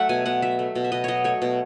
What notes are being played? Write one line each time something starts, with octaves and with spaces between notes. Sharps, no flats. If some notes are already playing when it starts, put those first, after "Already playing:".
Already playing: F#3 A3 E5 F#5
B2 G#5
B2 F#5
F#3 E5
A3
B2
E5
B2 D#5
F#3 C#5 D#5
A3 C#5
B2